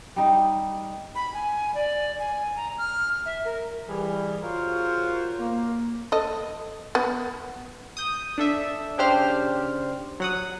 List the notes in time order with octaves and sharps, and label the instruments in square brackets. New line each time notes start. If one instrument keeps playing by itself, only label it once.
[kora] G3 D#4
[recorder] B5
G#5
D5
G#5
A#5
F6
E5
A#4
[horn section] E3 G3 G#4
F4 F#4 G#4 A#4 C5 C#5
A#3
[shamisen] A4 D#5
B3
[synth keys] D#6 G6
D4 A4 E5
C#3 D4 G4 C5 F6
F#3 F#5 D#6